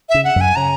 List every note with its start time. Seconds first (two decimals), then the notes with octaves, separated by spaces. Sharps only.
0.09 E5
0.14 C#3
0.25 F#5
0.36 F#2
0.41 G#5
0.56 C#3 A#5